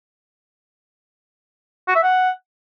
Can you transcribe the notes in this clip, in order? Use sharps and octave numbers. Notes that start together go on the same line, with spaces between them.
F#4
E5
F#5